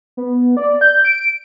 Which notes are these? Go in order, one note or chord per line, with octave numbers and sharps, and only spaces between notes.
B3
D5
G6
D7